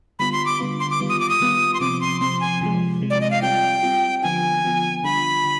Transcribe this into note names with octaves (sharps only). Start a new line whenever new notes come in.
D3 G3 B3 F4 B5
C6
D6
D3 G3 B3 F4
C6
D6
D#3 G3 B3 F4
D#6
D6
D#6
D#3 G3 B3 F4
C6
C3 F3 C4 D6
C6
C3 F3 C4 C6
G#5
C3 F3 G#3
C3 F3 G#3
D5
D#5
F5
G3 C4 F4 G5
G3 C4 F4
D3 F3 B3 F4 G#5
D3 F3 B3 F4
D3 G3 D4 F4 B5
D3